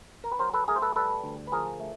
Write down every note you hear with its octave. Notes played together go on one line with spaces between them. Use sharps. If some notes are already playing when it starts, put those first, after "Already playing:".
A#4
B4
F#3 A#4 C5
A4 B4
A3 G#4 A#4
C5
A4 B4
G3 A4 B4
D2
B4
F3 G#4 A#4
A3